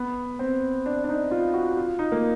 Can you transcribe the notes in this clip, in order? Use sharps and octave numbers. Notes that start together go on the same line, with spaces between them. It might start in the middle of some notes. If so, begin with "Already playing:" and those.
Already playing: B3
C4
D4
D4
D#4
F4
F#4
F4
D#4
A#3